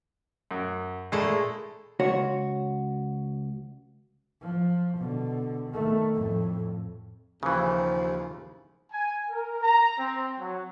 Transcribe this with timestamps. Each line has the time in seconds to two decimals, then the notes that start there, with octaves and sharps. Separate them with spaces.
0.51 F#2
1.12 A#2 G#3 A3 E4
2.00 C#2 F#4 C#5
4.42 F3
4.98 B2 D3
5.70 D#3 A3
6.14 F2 A2
7.43 D#2 C#3 E3 F3
8.92 G#5
9.30 A#4
9.62 A#5
9.99 C4
10.39 F#3